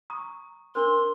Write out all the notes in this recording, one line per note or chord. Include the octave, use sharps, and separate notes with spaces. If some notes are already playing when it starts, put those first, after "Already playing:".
A#5 C#6 D#6
D4 A#4 C5 C6